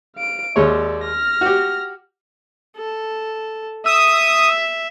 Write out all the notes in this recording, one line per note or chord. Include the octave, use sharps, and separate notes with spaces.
F5 D7
D#2 G#3 C#5 D5 E5
F6 A#6
F#4 G4
A4
E5 D#6 E6